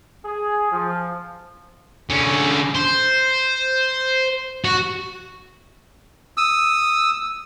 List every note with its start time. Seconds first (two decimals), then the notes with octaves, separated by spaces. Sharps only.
0.24 G#4
0.71 F3
2.10 D3 C#4
2.75 C5
4.65 F#4
6.37 D#6 E6